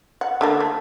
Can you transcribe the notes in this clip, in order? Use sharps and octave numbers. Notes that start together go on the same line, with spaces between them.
F#5
D3 A3 A#3
A3